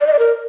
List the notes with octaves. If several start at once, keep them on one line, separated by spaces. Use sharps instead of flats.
D5
D#5
D5
A#4